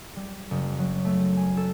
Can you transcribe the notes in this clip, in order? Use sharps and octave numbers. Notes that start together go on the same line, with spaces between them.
G3
F#1
F#3
A3
G#5
A4